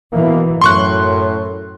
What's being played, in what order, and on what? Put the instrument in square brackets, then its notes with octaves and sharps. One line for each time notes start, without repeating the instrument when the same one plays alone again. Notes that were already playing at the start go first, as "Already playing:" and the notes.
[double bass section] B2 E3 [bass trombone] A#3
[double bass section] F#2 [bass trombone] A2 [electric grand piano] C6 C#6 F#6